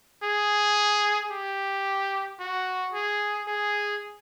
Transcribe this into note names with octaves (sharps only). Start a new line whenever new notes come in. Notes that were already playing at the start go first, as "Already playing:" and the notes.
G#4
G4
F#4
G#4
G#4